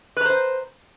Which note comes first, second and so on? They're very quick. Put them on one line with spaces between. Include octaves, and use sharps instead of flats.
B4 A#5 C5